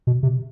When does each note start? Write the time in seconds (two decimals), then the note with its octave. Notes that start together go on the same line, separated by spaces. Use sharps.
0.07 B2
0.23 C3